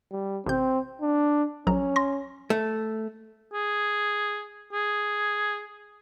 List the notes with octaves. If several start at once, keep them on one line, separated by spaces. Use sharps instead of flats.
G3
A1 C3 C4 G6
D4
A#1 F#3 C#4 A#5
C6 A#6
A3
G#4
G#4